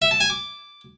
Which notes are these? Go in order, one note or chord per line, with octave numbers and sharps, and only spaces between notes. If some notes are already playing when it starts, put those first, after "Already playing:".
E5
A5
G#5
D6